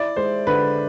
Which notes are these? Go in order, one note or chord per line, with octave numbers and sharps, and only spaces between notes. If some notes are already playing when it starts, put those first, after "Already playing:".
Already playing: E4 D5
G#3 C5
D3 B4